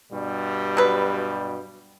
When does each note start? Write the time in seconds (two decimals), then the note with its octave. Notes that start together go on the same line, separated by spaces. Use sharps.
0.12 G2 B2 G3
0.77 F#3 B4